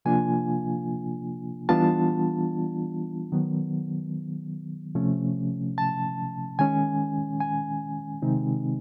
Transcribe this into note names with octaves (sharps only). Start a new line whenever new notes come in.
C3 F3 A#3 D4 F4 G#5
E3 G3 B3 D4 F4 A5
D#3 F#3 B3
C3 F3 A3 C#4
A5
D#3 G#3 C#4 G#5
G#5
C3 D#3 G#3 C4 D#4